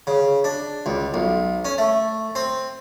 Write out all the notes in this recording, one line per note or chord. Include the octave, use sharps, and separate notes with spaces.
C#3
D4
C#2
B1
C#4
A3
C4